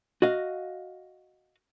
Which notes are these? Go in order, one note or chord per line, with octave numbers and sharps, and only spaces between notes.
F#4 D#5 F5